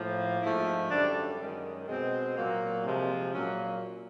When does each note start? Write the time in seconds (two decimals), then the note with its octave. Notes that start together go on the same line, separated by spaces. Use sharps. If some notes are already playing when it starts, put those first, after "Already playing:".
Already playing: A2 F3 A#3
0.41 G#2 F3 A3 E4
0.90 F#2 D3 G3 D4
1.38 F#2 D#3 G#3 C#4
1.87 B2 G#3 C4
2.36 A#2 F#3 A#3
2.84 C3 F3 G#3
3.33 A#2 F#3 A#3 C#4